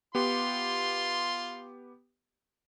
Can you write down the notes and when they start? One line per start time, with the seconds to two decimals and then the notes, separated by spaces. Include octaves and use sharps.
0.15 B3 F4 G4 C6